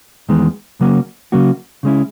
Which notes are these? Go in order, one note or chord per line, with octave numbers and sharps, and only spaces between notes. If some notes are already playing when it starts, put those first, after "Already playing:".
E2 D#3 G#3 B3
C#3 F#3 A#3 C#4 F#4
C#3 F#3 A#3 C#4 F#4
C#3 G#3 C#4 E4